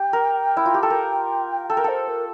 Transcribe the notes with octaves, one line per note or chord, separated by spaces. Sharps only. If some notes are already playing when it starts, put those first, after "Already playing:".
Already playing: G4 G5
A#4
E4
F4
G4
A4
A#4
A4 G5
A#4
A4 C5
A#4